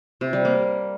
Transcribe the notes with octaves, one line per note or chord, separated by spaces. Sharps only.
C3
G3
A#3